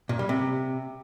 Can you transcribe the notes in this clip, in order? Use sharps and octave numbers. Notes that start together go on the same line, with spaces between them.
A#2
G3
C3